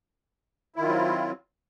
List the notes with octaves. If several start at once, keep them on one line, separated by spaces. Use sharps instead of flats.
D#3 F#3 C4 E4 F4